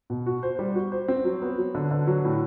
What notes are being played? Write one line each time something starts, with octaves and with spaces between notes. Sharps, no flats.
B2
F#4
C5
G3
F#4
C5
C4
F#3
B3
F#3
D3
D3
F#3
A2